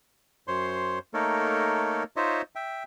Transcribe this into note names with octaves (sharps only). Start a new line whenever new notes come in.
F#2 C5 C#5 C6
A3 A#3 D#4 A4 A#4 C#5
D#4 F4 C5 C#5 D#5 E5
E5 G5